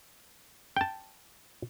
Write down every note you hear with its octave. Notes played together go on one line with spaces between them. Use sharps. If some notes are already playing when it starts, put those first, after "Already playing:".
G5 A5